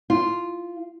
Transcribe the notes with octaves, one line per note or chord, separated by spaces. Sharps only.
F4